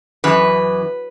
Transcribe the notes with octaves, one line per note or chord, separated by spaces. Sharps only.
F#2 E3 B4